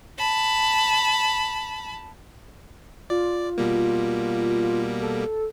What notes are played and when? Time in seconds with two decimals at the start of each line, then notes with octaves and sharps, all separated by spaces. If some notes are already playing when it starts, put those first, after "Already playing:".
0.18 A5 B5
3.10 F4 D5
3.58 B2 G3 A#3
5.02 A4